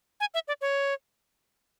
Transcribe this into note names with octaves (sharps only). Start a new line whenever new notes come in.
G#5
E5
D5
C#5